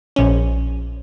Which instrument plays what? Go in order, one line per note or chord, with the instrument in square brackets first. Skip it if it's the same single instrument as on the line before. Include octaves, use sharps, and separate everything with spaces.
[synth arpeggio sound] A#1 C#4